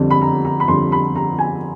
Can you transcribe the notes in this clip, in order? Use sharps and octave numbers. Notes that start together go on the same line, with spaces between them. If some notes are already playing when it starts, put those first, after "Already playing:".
Already playing: F2 D3 G3
B5
A#5
A#5
B5
F2 D3 G3 C6
B5
A#5
G#5